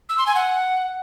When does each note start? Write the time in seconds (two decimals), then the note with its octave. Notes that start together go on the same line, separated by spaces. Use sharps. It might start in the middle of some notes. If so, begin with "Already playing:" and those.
0.09 E6
0.18 C6
0.26 G#5
0.35 F#5